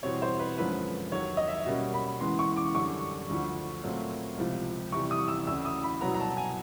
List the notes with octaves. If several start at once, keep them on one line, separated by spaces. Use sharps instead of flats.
E2 B2 G3 C4 C#5
C5
B4
F#2 D3 F3 G#3 B4
D#2 D#3 F#3 C#5
D#5
E5
B2 G3 A#3 C#4
B5
E2 C#3 E3 G#3 B3 C6
C#6
D6
F#2 D3 G3 C#6
D2 D3 F3
A#2 F#3 A3 C4
C#2 C3 F3
E2 C3 E3 G3 C#6
D#6
E6
D2 C#3 E3 E6
D#6
B5
C2 B2 F#3 B3 A#5
A#5
A5
G#5